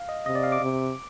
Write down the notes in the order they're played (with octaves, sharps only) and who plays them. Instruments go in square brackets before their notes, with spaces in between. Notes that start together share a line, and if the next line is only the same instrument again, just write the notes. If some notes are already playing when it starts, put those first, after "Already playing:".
Already playing: [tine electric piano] F5
D#5
[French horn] C3 [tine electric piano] D#5
[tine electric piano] D5
F5
D6
[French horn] C3